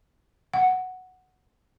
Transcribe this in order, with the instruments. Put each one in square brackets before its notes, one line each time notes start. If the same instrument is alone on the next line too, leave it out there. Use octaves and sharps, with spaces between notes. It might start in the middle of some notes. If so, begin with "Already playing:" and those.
[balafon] F#5